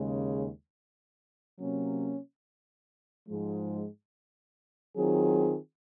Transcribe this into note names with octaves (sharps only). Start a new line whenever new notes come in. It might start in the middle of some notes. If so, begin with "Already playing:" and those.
Already playing: D#2 C#3 G#3
C3 F#3 A#3 C#4
G#2 F3 G#3
D#3 F#3 C4 F4 G#4